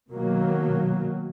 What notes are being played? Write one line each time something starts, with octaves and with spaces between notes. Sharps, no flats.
B2 D#3 F#3 A#3